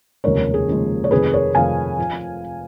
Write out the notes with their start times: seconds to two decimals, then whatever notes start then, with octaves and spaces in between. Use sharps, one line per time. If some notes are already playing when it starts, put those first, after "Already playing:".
0.24 F1 D#2 C#3 F3 G#3 A#4 C#5
0.54 G#4
0.68 F1 D#2 C#3 F3 G#3
1.04 C#5
1.11 F1 F2 D#3 G#4 B4
1.33 A#4 C#5
1.55 F1 F2 D#3 F5 G#5
1.98 F3